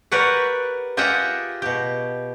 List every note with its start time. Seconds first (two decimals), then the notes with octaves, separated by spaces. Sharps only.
0.12 G4 A#4 B4 C#5 D5 F#5
0.97 F4 G4 G#4 D#5 E5 F#5
1.62 B2 G4